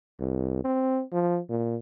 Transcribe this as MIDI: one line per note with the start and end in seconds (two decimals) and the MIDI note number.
0.20 0.61 36
0.64 1.02 60
1.13 1.40 53
1.50 1.76 46